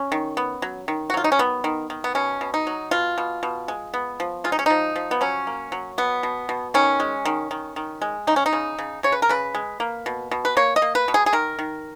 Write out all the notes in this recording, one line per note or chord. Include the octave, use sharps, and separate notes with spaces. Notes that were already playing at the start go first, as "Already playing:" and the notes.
Already playing: C#4
D#3
B3
F#3
D#3
F#4
F#3 F4
D#4
C#4
D#3 B3
D#3
D#3
B3
B2 C#4
B2
D#4
F#3
B2 F4
B2
B2
G#3
B3
F3
G#3 F4
D#4
C#4
F3 D#4
F3
B3
F#3 C#4
A#3
F#3
B2 B3
B2
B2
D#3 C#4
G#3
D#3
D#3
D#3
G#3
C#3 D#4
C#4
D#4
C#3
C#3
C#3 C#5
B4
A#4
C#3 B4
G#3
A#3
B2
B2
B4
A#3 C#5
D#5
A#3
B4
B2
G#4
G#4
D#3 A#4
D#3